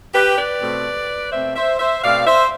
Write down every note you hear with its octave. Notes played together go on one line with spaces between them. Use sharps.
G4 B4
B4 D5
B2 A3 C4
B2 A3 C4 C5 E5
C5 E5
C5 E5
B2 A3 C4 D5 F5
C5 E5